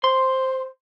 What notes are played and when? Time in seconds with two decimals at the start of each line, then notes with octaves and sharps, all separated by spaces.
0.04 C5 C6